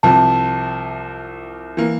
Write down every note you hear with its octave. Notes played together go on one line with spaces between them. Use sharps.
C2 C3 F3 A5
E3 A#3